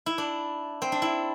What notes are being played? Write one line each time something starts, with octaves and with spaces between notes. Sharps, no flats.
E4
D4
C4
D4
E4